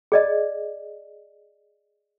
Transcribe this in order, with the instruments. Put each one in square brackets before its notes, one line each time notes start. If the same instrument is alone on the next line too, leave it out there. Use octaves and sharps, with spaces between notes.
[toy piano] G#4 D5 D#5